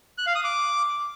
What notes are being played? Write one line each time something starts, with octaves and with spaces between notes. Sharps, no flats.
F#6
F5
D#6
D6